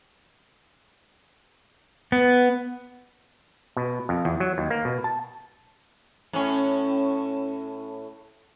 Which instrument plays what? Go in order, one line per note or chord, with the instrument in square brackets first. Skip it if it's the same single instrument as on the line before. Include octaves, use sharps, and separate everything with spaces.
[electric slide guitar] B3
[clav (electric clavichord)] B2
F2
E2
F#3
D#2
A#3
B2
A5
[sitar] A2 C#4